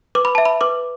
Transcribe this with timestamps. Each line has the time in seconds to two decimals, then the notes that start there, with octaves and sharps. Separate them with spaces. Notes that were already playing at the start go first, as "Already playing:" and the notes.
0.15 B4 D6
0.25 B5
0.35 E5 A5
0.45 B5
0.61 B4 D6